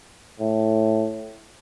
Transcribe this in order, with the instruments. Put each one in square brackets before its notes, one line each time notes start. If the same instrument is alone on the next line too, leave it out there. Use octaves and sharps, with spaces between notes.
[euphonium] A2